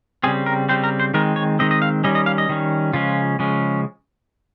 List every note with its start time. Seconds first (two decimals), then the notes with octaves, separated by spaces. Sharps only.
0.24 C#3 G3 C4 G#4
0.46 A#4
0.69 C#3 G3 C4 C5
0.83 A#4
1.00 C5
1.14 D#3 G#3 C4 A#4
1.36 C#5
1.59 D#3 G#3 C4 D#5
1.71 D#5
1.82 F5
2.04 D#3 G3 C#4 D#5
2.15 D#5
2.26 F5
2.38 D#5
2.49 D#3 G3 C#4
2.93 C#3 F3 G#3 C#4 F4
3.39 C#3 F3 G#3 C#4